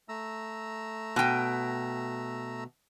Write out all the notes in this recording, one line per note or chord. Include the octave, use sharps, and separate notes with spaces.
A3 A#5 E6
B2 G5